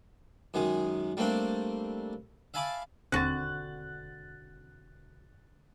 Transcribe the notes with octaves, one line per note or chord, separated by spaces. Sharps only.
F#2 D#3 G#3 G#4
G3 A3 A#3 C4 D4
E5 F5 G#5 A5 B5 D6
E1 D#2 D3 C4 F#4 F#6 A6